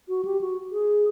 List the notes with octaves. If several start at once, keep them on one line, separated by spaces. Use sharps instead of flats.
F#4
G4
F#4
G#4